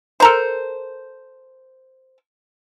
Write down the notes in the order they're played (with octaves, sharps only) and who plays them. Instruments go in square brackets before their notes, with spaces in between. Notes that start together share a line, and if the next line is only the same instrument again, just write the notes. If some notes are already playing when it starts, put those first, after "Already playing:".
[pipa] A4 A#4 C5